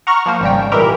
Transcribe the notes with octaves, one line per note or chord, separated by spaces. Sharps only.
F#5 A#5 C#6 F6
F3 A#3 C5
G#1 C#3 G3 G5
A#2 E3 G#3 E4 G4 A#4